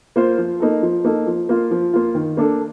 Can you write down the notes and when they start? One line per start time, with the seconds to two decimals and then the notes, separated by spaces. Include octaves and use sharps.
0.16 A#3 F4 C5
0.38 F3
0.60 A#3 D#4 A4
0.83 F3
1.05 A#3 D#4 A4
1.27 F3
1.49 A#3 F4
1.71 F3
1.93 A#3 F4
2.15 D#3
2.37 A#3 D4 A4